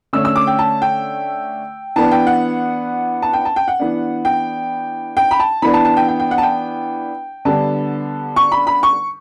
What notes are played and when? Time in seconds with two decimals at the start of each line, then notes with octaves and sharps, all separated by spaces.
0.13 D3 A3 C#4 E6
0.25 E6
0.36 D6
0.47 G5
0.59 A5
0.82 G5
1.96 E3 B3 D4 A5
2.12 G5
2.27 F#5
3.22 A5
3.33 G5
3.45 A5
3.56 G5
3.68 F#5
3.79 E3 B3 D4
4.25 G5
5.17 G5
5.31 B5
5.39 A5
5.62 E3 B3 D4 B5
5.74 A5
5.85 A5
5.97 G5
6.09 G5
6.20 G5
6.31 F#5
6.38 A5
6.43 G5
7.45 D3 G3 B3 D4 A5
8.36 C#6
8.52 B5
8.67 B5
8.83 C#6